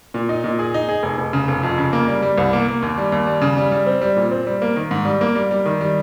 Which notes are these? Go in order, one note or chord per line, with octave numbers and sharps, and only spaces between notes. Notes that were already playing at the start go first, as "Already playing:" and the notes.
A#2
D#4
A#2
G#4
D#4
G#4
F1
F1
C#3
F1
F2
C#3
A#3
G3
G3
C2
A#3
A#3
D#2
G3
D#2
G3
C#3
G3
G3
C4
G3
A#2
C4
G3
A#3
D#3
G#2
G3
A#3
G3
G3
D#3
G3